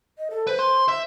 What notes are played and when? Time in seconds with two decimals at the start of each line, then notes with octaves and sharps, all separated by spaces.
0.18 D#5
0.31 A4
0.47 B4 C5
0.59 C6
0.88 E5